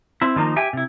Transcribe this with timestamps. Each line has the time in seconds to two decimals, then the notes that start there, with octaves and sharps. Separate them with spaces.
0.22 C4 E4
0.36 D#3 F3 A#3 D#4
0.56 G4 E5 G5 G#5
0.73 C3 E4